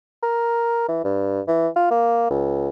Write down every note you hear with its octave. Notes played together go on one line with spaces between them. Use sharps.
A#4
E3
G2
E3
F4
A#3
C#2